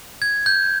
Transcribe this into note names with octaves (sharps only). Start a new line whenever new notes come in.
G#6
G6